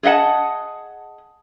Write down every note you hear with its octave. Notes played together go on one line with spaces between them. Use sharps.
G#4 D#5 E5 F#5 A5